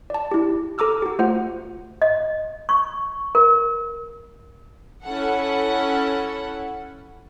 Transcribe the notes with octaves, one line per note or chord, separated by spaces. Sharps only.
D5 A5
E4 G4
A4 A#5 D6 E6 F6
F#4 G4
A3 F4 C5 F#5
D#5
C#6
A#4
C#4 E4 A4 F#5